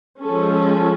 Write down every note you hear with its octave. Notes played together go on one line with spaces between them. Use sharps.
F3 G#3 C#4 A4
A4